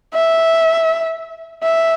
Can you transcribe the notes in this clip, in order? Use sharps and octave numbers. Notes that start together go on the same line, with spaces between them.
E5
E5